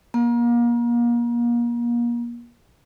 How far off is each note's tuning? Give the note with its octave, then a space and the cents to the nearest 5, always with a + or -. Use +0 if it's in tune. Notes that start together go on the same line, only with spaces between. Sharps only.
A#3 +30